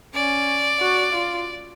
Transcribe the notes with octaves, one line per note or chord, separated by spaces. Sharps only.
C#4 D5
F#4
F4